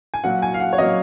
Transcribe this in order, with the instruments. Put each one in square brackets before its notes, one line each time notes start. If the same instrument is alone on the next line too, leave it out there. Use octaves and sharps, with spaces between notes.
[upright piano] G#5
A#2 F#3 A#3 F#5
G#5
F5
F#5
C#5
A#2 F#3 A#3 D#5